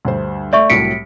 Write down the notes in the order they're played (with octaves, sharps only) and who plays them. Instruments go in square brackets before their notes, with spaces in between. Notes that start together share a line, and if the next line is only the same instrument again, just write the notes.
[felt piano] D2 G2 C5
[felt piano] A3 [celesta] D5 E5 C#6
[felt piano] C2 A2 F#3 [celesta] B6 C#7 D7